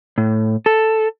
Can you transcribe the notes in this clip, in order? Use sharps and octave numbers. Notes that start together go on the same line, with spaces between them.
A2
A4